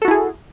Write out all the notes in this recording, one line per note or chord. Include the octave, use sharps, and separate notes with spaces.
E4 F#4 G#4 A4